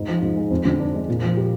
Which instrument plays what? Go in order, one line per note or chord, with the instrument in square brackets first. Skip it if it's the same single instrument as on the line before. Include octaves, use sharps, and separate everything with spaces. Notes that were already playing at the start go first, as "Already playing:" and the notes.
Already playing: [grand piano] G#2
F3
G#2
G#3
F2
D3
D4
G#3
A#2
F3
G4